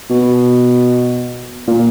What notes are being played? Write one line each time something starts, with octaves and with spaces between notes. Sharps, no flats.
B2
A#2